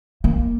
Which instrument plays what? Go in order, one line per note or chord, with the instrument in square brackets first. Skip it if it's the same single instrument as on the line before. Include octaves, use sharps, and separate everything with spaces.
[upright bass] A#3